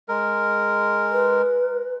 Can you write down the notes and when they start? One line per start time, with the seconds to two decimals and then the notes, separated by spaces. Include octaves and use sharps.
0.09 G#3 A#4
1.12 B4